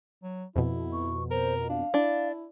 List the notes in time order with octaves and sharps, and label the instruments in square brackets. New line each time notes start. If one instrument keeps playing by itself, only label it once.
[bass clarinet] F#3
[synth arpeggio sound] F2 B2 [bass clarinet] E4
[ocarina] C#6
[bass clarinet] A#4 [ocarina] C5
[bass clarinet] D4 [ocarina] F5
[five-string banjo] D4 [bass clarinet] E4